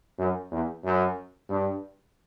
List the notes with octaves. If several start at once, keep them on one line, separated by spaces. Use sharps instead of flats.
F#2
E2
F#2
G2